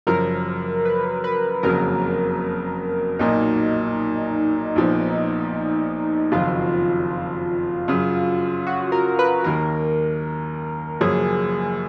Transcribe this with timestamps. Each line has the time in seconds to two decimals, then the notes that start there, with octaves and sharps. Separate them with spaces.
0.07 F#1 F#2 F3 A#4
0.85 B4
1.24 B4
1.63 F#1 F2 C#3 F#3 A#3 A#4
3.19 B1 A#2 F#3 A#3 D#4
4.76 A#1 A#2 F3 B3
6.32 F#1 F2 D#3 F#3 F4
7.88 F#2 C#3 F#3
8.67 F#4
8.92 A#4
9.19 B4
9.44 D#2 D#3 A#3 A#4
11.01 F#1 F#2 F3 A#3 C#4 G#4